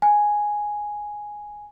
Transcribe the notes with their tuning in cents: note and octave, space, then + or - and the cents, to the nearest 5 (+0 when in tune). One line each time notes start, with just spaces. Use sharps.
G#5 +0